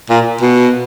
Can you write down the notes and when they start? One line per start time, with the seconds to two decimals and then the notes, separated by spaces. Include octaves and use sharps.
0.10 A#2
0.41 B2